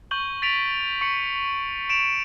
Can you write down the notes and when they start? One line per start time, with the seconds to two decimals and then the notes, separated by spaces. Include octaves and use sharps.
0.11 C#6 G6 F#7 G7
0.42 A6 B6 D7 F7
1.01 C#6 C#7 F#7
1.89 D7 E7 F7